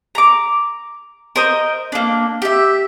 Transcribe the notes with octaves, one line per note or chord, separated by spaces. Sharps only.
A#5 D6
A#4 C5 D#5
A#3 D4
G4 E5